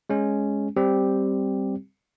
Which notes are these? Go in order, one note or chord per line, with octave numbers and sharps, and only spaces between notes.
G#3 C#4
G3 C4 G4